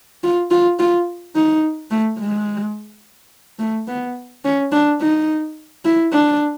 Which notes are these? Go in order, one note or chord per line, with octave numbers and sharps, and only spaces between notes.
F4
F4
F4
D#4
A3
G#3
A3
B3
C#4
D4
D#4
E4
D4